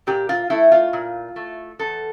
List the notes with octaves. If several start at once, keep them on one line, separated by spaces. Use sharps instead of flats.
A#2 G4
F4
A3 E4
F4
A#2
A3
E2 A4